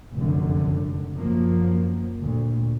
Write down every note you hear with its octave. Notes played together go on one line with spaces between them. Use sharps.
F1 C#2 F#2 D3
F#2 F3 A#3
D2 A#2